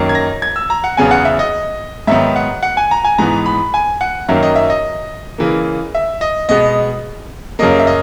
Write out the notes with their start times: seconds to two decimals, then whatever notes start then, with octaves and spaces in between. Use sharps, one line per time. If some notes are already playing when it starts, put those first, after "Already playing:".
Already playing: F#2 D#3 A#3
0.09 G#6
0.15 A#6
0.42 G#6
0.56 E6
0.70 A#5
0.84 F#5
0.97 E2 C#3 F#3 B3 G#5
1.11 F#5
1.25 E5
1.39 D#5
2.07 G#2 D#3 F#3 B3 E5
2.36 F#5
2.63 F#5
2.77 G#5
2.91 A#5
3.05 G#5
3.18 G#2 E3 B3 A#5
3.46 B5
3.74 G#5
4.01 F#5
4.29 F#2 D#3 F#3 A#3 E5
4.43 D#5
4.56 E5
4.70 D#5
5.38 C#3 E3 A#3
5.95 E5
6.21 D#5
6.49 B2 G#3 B3 D#5
7.59 F#2 C#3 F#3 A#3 D#5
7.79 E5
7.87 D#5